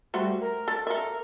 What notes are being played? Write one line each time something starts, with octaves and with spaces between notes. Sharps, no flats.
G3 A3 F#4 C5
A#4
A4
A4 A#4 E5